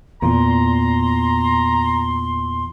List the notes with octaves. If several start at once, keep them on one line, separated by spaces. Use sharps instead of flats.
E2 A#2 A#5 C6